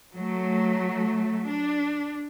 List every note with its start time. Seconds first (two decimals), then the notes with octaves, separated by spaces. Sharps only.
0.15 F#3 A3
1.46 D4